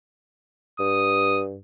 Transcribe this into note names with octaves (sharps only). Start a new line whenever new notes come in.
G2 D#6